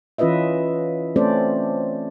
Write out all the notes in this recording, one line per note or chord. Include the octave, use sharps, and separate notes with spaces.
E3 C#4 F4 B4 D#5 E5
A3 C4 C#4 A4 C5 D5